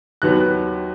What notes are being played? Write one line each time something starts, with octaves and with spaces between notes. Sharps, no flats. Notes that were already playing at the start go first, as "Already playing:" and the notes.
D#2 D#3 F#3 B3 F#6